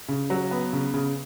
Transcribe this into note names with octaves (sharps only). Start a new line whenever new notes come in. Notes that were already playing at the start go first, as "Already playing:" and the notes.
C#3
F#3
B3
C#3
C#3